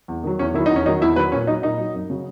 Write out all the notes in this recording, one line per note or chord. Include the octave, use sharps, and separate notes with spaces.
E2
D#3 F#3
E2 C#4
D#3 F#3 E4
E2 D#4
C#4
D#3 F#3 D#4
E2 E4
D#3 F#3 B4
A#2 C#4
F#3 D#4
A#2 D#4
F#3
F#2
C#3 F#3